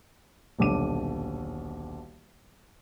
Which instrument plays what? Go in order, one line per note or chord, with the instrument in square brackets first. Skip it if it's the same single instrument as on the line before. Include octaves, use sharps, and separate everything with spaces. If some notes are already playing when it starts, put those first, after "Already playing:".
[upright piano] D#1 B1 D3 D6 D#7